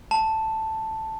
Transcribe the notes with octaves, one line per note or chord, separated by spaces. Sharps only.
A5